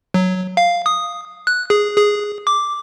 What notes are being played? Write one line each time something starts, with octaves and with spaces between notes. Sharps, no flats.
F#3
F5
D#6
F#6
G#4
G#4
D6